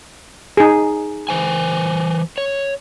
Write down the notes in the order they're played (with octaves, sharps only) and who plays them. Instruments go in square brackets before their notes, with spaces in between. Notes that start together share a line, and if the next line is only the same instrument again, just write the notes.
[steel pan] D#4 G#4
[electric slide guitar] E3 C5 G#5
C#5